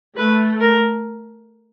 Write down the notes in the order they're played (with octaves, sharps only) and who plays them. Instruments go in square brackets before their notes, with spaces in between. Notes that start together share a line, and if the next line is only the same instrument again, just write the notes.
[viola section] A3 [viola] B4
[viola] A#4